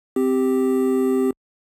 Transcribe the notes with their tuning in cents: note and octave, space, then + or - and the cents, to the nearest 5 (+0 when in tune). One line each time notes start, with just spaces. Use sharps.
C4 -15 G4 +0